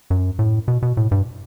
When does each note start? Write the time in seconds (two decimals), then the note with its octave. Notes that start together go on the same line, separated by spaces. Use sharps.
0.10 F#2
0.39 A2
0.68 B2
0.82 B2
0.97 A2
1.11 G2